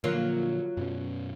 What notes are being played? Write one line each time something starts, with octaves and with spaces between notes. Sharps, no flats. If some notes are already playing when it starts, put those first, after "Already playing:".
A#2 D3 F3 F#3 A#3 F4
F#2 B2 C#4